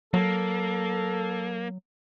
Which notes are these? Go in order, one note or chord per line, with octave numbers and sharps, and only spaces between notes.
F#3 A#3 A4